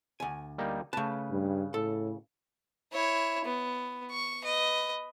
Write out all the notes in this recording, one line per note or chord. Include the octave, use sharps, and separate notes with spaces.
D2 G#5
G3 A#3 D#4
C#3 A3 B4 A5
G2
A2 A4
E4 C#5
B3
C#6
B4 D#5